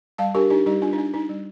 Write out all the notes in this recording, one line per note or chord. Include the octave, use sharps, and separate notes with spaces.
G3 F5 A5
D4 G4 A#4
D4 D#4 G4
G3 D#4 G4
G3 D4 F4
D#4
D4
D4 D#4
G3